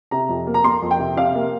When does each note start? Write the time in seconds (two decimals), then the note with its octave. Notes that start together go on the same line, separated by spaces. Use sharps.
0.11 C3 A#5
0.29 F2
0.47 A#3
0.54 A#5
0.64 A#3 C6
0.82 F2
0.91 G5
0.99 C3
1.17 C3 F5
1.35 A#3